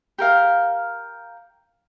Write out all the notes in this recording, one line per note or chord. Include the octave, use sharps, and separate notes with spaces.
G4 A#4 F5